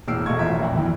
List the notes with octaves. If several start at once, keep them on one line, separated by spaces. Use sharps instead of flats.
E1 A2 E6 F6 C7 D7
E1 A3 D#5 F5 C#6 G#6
A1 B2 F4 E5
A#1 F2
D2 A2 E3